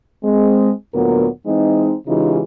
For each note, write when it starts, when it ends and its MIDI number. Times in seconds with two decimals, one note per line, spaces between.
0.22 0.70 56
0.22 0.70 60
0.93 1.26 38
0.93 1.26 46
0.93 1.26 54
0.93 1.26 59
0.93 1.26 70
1.45 1.93 52
1.45 1.93 56
1.45 1.93 60
1.45 1.93 63
2.07 2.41 49
2.07 2.41 52
2.07 2.41 56
2.07 2.41 63
2.07 2.41 65
2.07 2.41 67